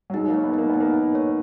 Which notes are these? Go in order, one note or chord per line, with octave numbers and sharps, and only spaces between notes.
F#3
G#3 D#4
A#3
C#5
B3
A#3 D#4
B3 D#4
A#3
D#4
C#5